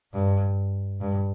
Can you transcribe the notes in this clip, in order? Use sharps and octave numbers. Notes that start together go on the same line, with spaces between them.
G2
G2